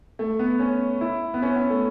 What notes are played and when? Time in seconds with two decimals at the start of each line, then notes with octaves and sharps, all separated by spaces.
0.19 A3
0.39 B3
0.60 C#4
1.01 E4
1.34 B3
1.42 C#4
1.56 B3
1.70 A3